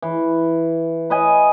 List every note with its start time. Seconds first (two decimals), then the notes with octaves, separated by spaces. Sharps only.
0.02 E3
1.10 B4 D#5 G#5